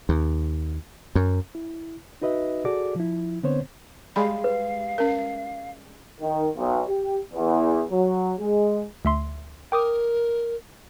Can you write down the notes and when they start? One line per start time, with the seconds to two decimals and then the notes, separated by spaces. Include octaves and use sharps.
0.09 D#2
1.15 F#2
1.55 E4
2.22 D#4 F#4 B4 D#5 E5
2.65 F#4 G#4 A4 D5 D6
2.96 F3 E4
3.43 D3 B3 C4 C5 C#5
4.16 G3 G#3 F5 B5
4.44 B4
4.98 C#4 A#4
6.21 D#3
6.56 B1
6.88 G4
7.33 E2
7.91 F#3
8.39 G#3
9.05 D2 E5 C6
9.72 A#4 G5 D6 D#6